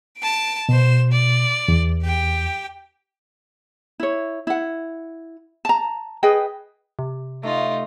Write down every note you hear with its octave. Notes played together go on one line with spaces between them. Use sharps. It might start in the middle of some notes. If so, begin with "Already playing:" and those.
A5 D7
B2 C5 E7
D5
E2
G4 G5
E4 C#5
E4 F#5
A5 A#5
G#4 B4 D#5 G5
C3
A3 D#4 F4